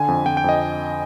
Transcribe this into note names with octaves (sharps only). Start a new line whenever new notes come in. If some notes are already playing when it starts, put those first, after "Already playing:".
Already playing: D3 G#5
F2
F2 G5
G5
F2 D#5